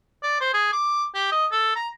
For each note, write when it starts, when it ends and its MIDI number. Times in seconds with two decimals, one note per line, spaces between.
0.23 0.40 74
0.41 0.52 72
0.54 0.68 68
0.73 1.05 86
1.15 1.31 67
1.32 1.47 75
1.52 1.75 69
1.76 1.88 82